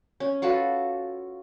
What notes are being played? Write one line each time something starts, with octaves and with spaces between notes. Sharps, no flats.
C#4
F4 F#4 A4 B4